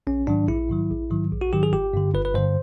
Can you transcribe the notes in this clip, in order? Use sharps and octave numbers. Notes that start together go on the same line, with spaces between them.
A#1 C#4
G#2 D#3 F#3 D4
A#1 E4
G#2 D#3 F#3
A#1
G#2 D#3 F#3
A#1
F#4
G#2 D#3 F#3 G4
G#4
G1 G4
G2 D3
G1 B4
B4
G2 D3 C5